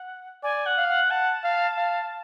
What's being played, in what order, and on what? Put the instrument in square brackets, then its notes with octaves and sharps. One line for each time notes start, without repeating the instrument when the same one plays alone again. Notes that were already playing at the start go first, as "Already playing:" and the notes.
Already playing: [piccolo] F#5
[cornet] D5 [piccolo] G#5
[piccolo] F#5
[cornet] F5
[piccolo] F#5
[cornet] F#5 [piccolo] A5
[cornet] F5
F5